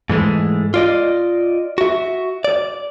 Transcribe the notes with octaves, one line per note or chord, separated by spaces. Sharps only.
G#2 E3 G#3 A3
F4 D5 D#5
F#4 E5
D5